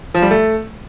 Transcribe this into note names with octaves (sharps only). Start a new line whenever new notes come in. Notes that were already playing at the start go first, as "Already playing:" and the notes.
F3
G3
A3